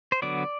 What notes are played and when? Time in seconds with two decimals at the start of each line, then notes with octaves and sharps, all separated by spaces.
0.12 C5
0.22 D3 F#3 B3 D5